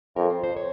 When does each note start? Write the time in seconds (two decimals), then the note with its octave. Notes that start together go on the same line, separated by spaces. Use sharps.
0.16 F2 A#4
0.30 C5
0.44 C5
0.57 C#5